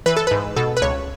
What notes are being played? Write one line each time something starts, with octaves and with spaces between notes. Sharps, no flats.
E3 B4
A4
G#2 B4
B2 A4
B4
C#2 C#5